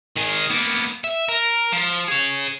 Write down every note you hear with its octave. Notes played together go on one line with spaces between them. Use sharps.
D#3 G#4
A#3 B3
E5
A#4
F3
G#4 C#5